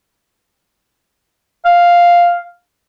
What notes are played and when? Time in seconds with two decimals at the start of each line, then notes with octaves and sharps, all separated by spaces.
1.65 F5